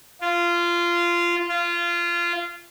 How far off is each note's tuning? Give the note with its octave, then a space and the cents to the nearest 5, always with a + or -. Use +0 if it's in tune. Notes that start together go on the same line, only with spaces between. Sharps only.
F4 -15
F4 -20